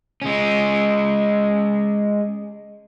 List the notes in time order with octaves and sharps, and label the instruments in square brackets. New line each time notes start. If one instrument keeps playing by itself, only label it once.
[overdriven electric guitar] G#3 C#4